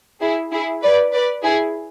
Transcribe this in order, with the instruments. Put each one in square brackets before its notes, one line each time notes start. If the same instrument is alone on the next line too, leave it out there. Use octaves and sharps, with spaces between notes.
[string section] E4 G#4
E4 G#4
B4 D5
B4 D5
E4 G#4